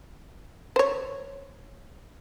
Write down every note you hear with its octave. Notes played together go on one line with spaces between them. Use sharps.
C5 C#5